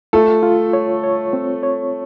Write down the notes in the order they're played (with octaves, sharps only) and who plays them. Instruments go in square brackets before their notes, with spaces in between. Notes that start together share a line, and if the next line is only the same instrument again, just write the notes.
[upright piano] A3 A4 [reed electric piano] F4
[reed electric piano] F4
C#5
C#5
C4
C#5